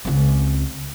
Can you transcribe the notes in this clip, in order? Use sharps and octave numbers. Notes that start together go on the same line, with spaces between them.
C#2 C4